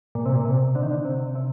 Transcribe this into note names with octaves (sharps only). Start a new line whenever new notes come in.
A#2
C3
A#2
C3
D3
D#3
D3
C3
C3